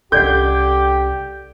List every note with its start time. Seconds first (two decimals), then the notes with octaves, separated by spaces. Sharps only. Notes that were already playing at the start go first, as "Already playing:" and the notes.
0.12 C2 C#4 G4 A4 D5 F#5 G6